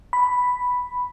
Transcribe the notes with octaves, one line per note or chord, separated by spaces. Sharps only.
B5